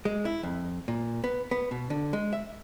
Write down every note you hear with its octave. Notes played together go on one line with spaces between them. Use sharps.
G#3
E4
F2
A#2
B3
B3
B2
D3
G#3
E5